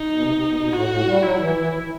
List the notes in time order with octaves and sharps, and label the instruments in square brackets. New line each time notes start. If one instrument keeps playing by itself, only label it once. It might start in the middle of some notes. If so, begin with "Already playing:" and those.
Already playing: [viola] D#4
[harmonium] B2
C3
C3
B2
B2
[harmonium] A2 [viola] F#4
[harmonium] A2
G3
[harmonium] F#3 [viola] E4
[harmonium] E3
E3
E3
E3